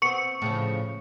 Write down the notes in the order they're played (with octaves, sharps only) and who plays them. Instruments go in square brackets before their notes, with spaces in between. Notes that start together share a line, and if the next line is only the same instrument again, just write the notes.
[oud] B3 C4 [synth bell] C#6 C#7
[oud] A2 C#3 F3